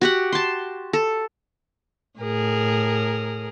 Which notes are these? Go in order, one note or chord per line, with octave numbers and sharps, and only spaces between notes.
F#4 G4 F#5
A5 C6
A4
A2 G#4 A#4